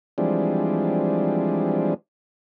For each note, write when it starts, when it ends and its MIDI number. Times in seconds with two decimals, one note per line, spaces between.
0.18 1.94 52
0.18 1.94 53
0.18 1.94 55
0.18 1.94 56
0.18 1.94 60
0.18 1.94 62